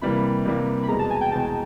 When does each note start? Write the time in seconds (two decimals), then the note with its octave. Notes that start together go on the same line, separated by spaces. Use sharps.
0.01 C3 E3 G3 A#3 B5
0.45 C3 E3 G3 A#3
0.83 B5
0.88 E2 B2 G#3 A#5
0.99 A5
1.10 G#5
1.21 G5
1.32 E2 B2 G#3 A5